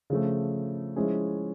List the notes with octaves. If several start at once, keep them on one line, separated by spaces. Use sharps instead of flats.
C#3 F3 A3
F3 G#3 C#4 E4 G#4